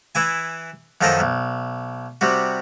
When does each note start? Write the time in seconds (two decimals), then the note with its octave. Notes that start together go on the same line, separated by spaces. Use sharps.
0.15 E3 E4 G#5
1.01 F#2 D#3 F3 A4 A#4 D#5
1.20 B1
2.21 C3 G3 F#4